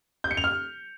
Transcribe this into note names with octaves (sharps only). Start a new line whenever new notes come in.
G6
C#7
F7
F6